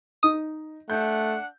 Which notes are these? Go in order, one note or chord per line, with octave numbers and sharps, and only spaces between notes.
D#4 D#5 D#6
A3 D4 F#5 G6